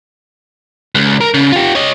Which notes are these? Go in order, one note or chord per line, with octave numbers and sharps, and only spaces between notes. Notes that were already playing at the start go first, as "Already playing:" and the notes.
C#2
A#4
C#3
F4 G4
C#5 D#5